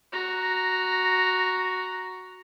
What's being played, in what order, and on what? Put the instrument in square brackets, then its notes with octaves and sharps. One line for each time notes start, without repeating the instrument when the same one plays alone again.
[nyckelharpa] F#4 A#5